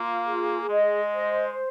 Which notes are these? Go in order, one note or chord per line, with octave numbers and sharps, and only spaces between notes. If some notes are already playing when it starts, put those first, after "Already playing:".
Already playing: A#3 F4
G#4
G#3 D#5
C5